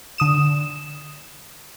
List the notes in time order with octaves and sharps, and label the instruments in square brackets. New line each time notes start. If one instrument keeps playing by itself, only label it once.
[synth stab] D3 D#6 E7